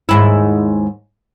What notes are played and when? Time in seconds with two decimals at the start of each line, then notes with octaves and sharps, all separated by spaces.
0.09 D#2 G#2 E4